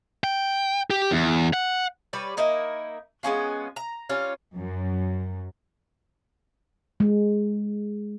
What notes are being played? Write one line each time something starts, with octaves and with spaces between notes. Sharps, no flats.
G5
G4
E2
F#5
G3 B4 C#5 D5
A#3 D#4 E4 A#4
G#3 B3 C#4 F4
A#5
G3 C#4 F4
F#2
G#3